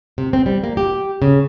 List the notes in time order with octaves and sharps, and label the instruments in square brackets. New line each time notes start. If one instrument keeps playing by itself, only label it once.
[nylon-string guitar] C3
C4
G3
A#3
G4
C#3